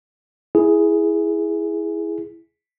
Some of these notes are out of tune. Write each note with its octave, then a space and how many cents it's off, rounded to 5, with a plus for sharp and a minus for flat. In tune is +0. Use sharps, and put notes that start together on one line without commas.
E4 +0 G#4 +0